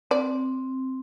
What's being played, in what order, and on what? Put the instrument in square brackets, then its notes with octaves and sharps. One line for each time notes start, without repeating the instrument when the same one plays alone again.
[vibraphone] C4 [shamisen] D5